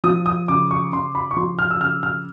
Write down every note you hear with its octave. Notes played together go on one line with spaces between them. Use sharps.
F3 D#6
D#6
C#3 D6
C#6
C#3 C6
B5
C#6
F3 C6
F6
E6
C#3 F6
F6